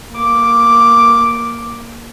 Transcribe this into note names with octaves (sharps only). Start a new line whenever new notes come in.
A#3 D6